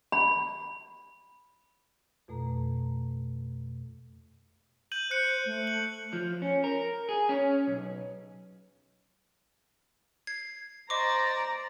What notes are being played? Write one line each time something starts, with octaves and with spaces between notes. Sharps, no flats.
B5
F2 B2 A3 A4 A#5
G6 D#7 F#7
C5 F#6 C#7
A3
F#7
F3
C#4
A#4
G#4
C#4
B1
G#6 C7
C5 D5 D#5 A#5 C#6 D6